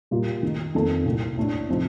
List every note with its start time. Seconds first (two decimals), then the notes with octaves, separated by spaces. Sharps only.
0.11 A#2 G3 A#3 F4
0.43 D#3 A3 D#4
0.75 F2 D#3 A#3 F4 A4
1.06 C2 A#2 A3
1.37 A2 A3 D4
1.68 C3 F3 A3 D#4